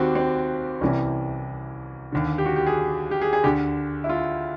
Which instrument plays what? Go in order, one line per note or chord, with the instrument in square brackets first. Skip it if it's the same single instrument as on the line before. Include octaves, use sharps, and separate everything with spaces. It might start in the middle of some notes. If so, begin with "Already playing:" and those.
Already playing: [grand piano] D#2 D#3 C4 F#4 G4
C4
C2 C3 E3 C#4
D#2 D3
G4
F#4
G4
G#4
G4
G#4
G#4
D2 D3 G4
E4
F4